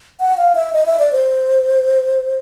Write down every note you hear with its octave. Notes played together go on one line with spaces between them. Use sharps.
F#5
F5
E5
D#5
E5
D5
C5